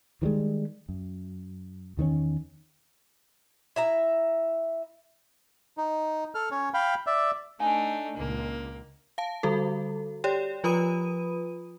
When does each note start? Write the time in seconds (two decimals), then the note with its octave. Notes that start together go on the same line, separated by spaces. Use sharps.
0.22 D#3 E3 G3 G#3
0.89 F#2
1.97 E2 D#3 B3 C#4
3.76 E4 E5 A#5
5.78 D#4
6.35 A4 F6
6.51 C#4 C#5
6.74 F5 G5 B5
7.07 D5 E5
7.60 A3 D4 D#4 G#5
8.16 C#2 A#2 A#3
9.18 F5 A5
9.43 D3 G3 F#4 A4
10.24 G4 C#5 D5 G5
10.64 F3 F4 B4 B5 D#6 D#7